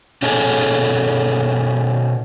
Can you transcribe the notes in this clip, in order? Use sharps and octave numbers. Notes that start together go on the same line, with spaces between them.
B2 C#4 D#4 G#4 A4